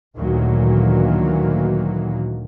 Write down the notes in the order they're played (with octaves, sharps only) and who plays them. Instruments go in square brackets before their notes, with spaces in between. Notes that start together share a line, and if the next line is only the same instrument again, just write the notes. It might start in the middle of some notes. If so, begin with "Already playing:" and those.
[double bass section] D2 A#2 D#3 E3 F#3 A#3